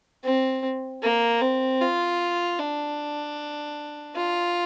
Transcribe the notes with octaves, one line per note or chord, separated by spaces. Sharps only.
C4
A#3
C4
F4
D4
F4